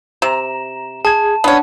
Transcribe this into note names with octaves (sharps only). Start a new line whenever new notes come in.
C3 A#5 E7
G#4 A5 G#6
B3 C#4 D4 F#5